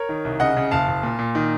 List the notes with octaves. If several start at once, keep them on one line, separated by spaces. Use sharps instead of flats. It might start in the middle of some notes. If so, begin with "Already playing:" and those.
Already playing: A#4 C#5
D#3
C2
C#3 D#5 F#5
C#3
F#1 F5 A5
F#1
A#2
A#2
D#3